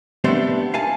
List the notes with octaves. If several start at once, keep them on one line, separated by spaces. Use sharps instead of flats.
A3 B3 C4 D4 G4 C5
F5 G#5 A5